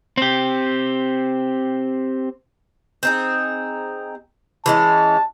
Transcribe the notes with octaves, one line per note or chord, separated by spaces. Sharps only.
C4 G4
C4 D#4 G#4
E3 G#3 C#4 A5